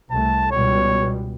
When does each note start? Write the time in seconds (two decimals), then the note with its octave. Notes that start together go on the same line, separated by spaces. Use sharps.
0.11 C2 A3 A5
0.51 C#2 B2 G3 C#5